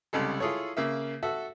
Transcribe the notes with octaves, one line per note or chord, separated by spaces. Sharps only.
C2 C#3 G3 G#3 A4
E4 F4 G#4 A4 C#5
C#3 A#3 E5
F#4 A4 E5